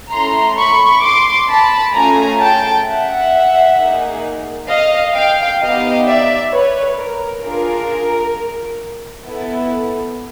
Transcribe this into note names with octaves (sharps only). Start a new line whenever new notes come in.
A3 C#4 E4 A4 A#5 C6
B5 C#6
C6 D6
A5 B5
A3 C#4 F4 G#4 G#5 A#5
G5 A5
E5 F#5
A#3 D#4 G#4
D#5 F5
F5 G5
B3 D#4 G4 D#5 F5
D5 E5
B4 C#5
A#4
D4 F4 G#4 A#4
B3 E4 A4